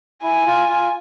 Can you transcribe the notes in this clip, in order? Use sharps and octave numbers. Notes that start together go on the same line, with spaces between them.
E4 G#5
F4
F4